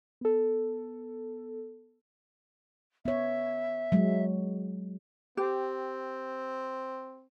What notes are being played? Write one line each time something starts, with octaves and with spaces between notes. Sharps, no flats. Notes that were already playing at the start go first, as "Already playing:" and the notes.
B3 A4
B3 C#5 E5
F#3 G#3
C4 G4